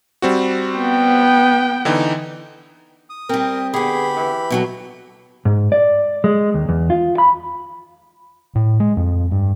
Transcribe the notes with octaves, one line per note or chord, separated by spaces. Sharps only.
G3 C4 F#4
B3 G5
D3 E3 D#4
D#6
G3 C4 A#4
D3 B3 G4 G#4 B5
E3
B2 F#3 A4
G#2
D5
G#3
D#2
E2
F4
B5
A2
G#3
F2
G2